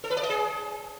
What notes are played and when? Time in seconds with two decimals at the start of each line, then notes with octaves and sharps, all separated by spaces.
0.04 A4
0.10 B4
0.17 D5
0.23 D#5
0.30 G#4